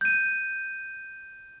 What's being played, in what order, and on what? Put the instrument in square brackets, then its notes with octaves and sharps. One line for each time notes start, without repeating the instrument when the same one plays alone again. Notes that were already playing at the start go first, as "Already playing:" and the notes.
[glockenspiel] G6 D#7